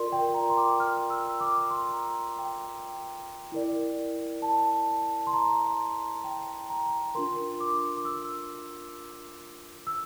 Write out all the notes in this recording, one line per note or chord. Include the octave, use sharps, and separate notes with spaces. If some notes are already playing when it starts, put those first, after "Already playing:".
Already playing: F4 A#4 D5 C6
G5
A#5
C6
D6
F6
E6
D6
C6
A#5
G5
E4 A#4 D5
A5
C6
A#5
G5
A#5
D4 F4 A#4 C6
D6
D6
E6
E6